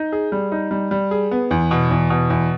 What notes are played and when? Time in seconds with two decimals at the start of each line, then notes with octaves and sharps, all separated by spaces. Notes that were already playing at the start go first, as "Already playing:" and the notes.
Already playing: D#4
0.12 G#4
0.32 G3
0.52 D#4
0.71 G3
0.91 G3
1.11 G#4
1.31 B3
1.51 E2
1.71 B2
1.91 E2
2.10 B2
2.30 E2